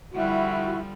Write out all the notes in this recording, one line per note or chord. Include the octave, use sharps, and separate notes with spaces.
D3 F3 G3 E4 F#4